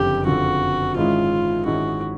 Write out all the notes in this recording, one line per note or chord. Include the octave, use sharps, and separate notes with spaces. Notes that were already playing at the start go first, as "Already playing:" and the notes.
Already playing: F#1 F2 D3 F3 G4
F#1 F2 D3 F3 F#4
G#2 D#3 G#3 C#4 E4 F4
G#2 D#3 G#3 C#4 E4 F#4